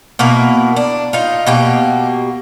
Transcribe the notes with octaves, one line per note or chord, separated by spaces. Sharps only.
B2 A#3 E4 A#4
D4
D#4 F4
B2 A#3 G4